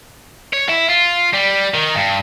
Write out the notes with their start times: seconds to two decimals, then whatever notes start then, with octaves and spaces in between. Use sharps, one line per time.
0.53 C#5
0.69 E4
0.89 F4
1.34 G3
1.74 D#3
1.95 G2